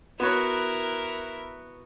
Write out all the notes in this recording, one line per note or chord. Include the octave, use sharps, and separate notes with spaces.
B3 E4 F#4 A#4 C#5